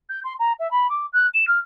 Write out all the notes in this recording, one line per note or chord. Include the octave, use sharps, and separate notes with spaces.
G6
C6
A#5
E5
B5
D6
F#6
E7
F6